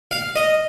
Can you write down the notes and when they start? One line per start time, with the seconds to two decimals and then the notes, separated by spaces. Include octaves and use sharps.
0.11 F5
0.36 D#5